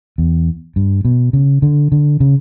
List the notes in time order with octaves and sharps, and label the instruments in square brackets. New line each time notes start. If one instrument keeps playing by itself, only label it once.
[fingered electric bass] E2
G2
B2
C#3
D3
D3
C#3